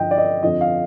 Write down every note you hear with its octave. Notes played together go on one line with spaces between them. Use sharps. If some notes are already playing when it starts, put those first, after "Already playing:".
Already playing: G2 D3 F3 D#5 G5
D5
D#5
F2 D3 F3 D#5
F5